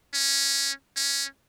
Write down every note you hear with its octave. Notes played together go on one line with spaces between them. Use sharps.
C#4
C#4